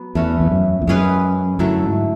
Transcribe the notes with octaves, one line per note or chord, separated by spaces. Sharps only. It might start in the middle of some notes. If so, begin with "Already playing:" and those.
Already playing: F#3 B3
E2 A3 C#4 F#4 B4
E2
F#2
E2
F#2 G#3 C#4 G#4 B4
F#2 D3 F#3 A3 E4
G#2